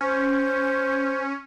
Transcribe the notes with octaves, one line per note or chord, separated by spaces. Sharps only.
C#4 C5